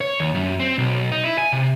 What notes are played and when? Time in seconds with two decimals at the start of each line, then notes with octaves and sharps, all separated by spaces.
0.01 C#5
0.20 D#2
0.35 F#2
0.60 C4
0.78 B1
1.11 D#4
1.24 E4
1.38 G#5
1.53 C3